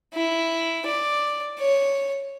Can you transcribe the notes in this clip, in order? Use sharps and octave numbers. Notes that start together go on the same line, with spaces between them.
E4
D5
C#5